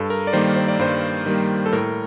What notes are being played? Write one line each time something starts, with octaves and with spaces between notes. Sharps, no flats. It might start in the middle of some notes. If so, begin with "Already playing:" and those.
Already playing: G2 A4
A#4
D5
D#3 G3 A#3 C5
C5
D5
G2 C5
D#3 G3 A#3
A4
A2 A#4